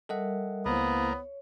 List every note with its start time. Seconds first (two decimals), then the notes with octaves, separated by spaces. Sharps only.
0.09 G3 A4 A#4 D#5 E5 F#5
0.66 C#2 A#3 B3 E4 C5 F5
1.10 C#5